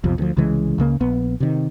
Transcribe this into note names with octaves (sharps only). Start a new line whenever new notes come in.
B1 F2 C3 F3
D2 F3
C2 C#3 E3 G#3
C#2 C#3 A#3
A#1 B3
C3 D#3